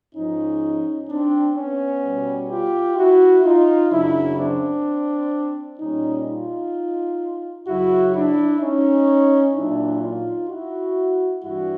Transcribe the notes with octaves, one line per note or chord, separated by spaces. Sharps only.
G#2 F3 C#4 D#4
C4 D4
B3 C#4
B2 G3
F4 G4
E4 F#4
D#4 F4
F#2 C#3 F#3 D4 E4
C4 D4
A#2 G3 C#4 D#4
D#4 F4
F#2 C#3 F#3 E4 F#4
D4 E4
C#4 D#4
A#2 F#3 D4 E4
D#4 F4
E4 F#4
G2 E3 G3 E4 F#4